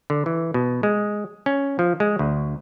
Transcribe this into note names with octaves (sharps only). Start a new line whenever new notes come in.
D3
E3
B2
G#3
C#4
F3
G#3
D2